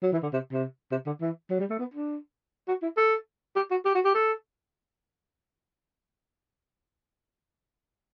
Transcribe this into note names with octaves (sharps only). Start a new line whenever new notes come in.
F#3
E3
D3
C3
C3
C3
D3
E3
F#3
G3
A3
B3
D4
F#4
E4
A4
G4
F#4
G4
F#4
G4
A4